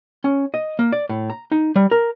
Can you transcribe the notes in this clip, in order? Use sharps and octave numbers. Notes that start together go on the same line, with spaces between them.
C#4
D#5
A#3
D5
A2
A#5
D#4
G3
A#4